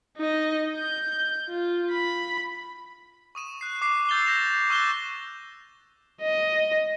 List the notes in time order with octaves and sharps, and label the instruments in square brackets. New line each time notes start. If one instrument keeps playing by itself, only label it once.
[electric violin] D#4 D#5
G6
F4
B5
[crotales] C#6 D#6 D#7 E7
F#6 C7
D6 C7
E6 G6 A6 D#7 F7 G7
G6 A#6 E7 F7
C#6 E6 F#6 C7 E7 G7
[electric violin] D#5